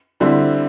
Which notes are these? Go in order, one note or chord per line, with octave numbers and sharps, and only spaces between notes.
D3 G3 C4 E4